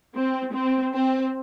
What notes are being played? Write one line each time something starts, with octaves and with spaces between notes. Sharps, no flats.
C4
C4
C4